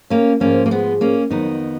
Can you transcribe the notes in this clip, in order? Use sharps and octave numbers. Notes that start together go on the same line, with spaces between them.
A#3 C#4
G#2 F3 A#3 C#4
A#3
G#3 B3
A#3 C#4
F2 D#3 F#3 B3 D#4